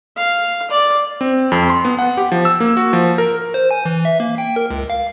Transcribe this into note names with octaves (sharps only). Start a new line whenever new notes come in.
F5
D5
C4
F2
C6
B3
F#5
G4
F3
E6
A#3
F#4
F3
A#4
C5
G#5
E3
E5
A#3
G5
A#4
C#2
F5